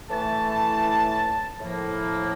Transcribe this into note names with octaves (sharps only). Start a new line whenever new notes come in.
A2 E3 A3 A5
A2 F3 A#3